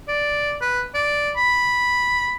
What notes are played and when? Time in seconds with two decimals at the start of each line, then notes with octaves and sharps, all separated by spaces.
0.08 D5
0.61 B4
0.94 D5
1.36 B5